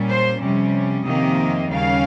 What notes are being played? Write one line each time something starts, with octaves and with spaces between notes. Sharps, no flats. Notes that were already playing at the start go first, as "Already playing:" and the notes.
Already playing: A#2 G3 C#4
C5
F2 C3 G3 C#4
F2 C3 D#3 A#3 C#4 D#5
D#2 C#3 G3 C#4 F5